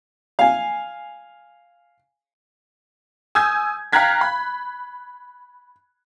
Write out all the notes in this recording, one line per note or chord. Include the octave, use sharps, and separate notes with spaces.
F5 G#5
G#5 D#6 E6 G6 G#6
F5 G5 A#5 F#6 G#6 B6
B5